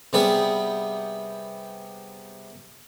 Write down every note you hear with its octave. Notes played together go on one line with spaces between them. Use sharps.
C3 G3 B3 G#4 B4